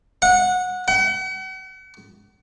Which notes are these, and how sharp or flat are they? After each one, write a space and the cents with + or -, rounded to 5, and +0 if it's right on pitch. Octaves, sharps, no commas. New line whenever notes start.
F#5 -20
F#5 +40